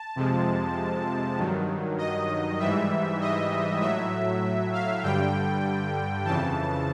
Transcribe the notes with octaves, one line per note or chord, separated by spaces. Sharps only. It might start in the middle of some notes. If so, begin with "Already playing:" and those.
Already playing: A5
F2 C3 F3 G#3
G2 D#3 F#3
D#5
G#2 E3 G3 E5
D#5
A2 F#3 E5
F5
G2 D3 G3 G5
F2 C#3 E3 A5